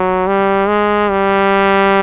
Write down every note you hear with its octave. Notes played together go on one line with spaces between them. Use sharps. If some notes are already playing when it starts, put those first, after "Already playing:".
Already playing: F#3
G3
G#3
G3